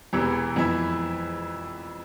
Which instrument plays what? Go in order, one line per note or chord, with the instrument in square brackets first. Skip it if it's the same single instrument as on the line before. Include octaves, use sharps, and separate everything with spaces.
[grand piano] E1 E2 C3 E3 B3
F2 E3 B3 E4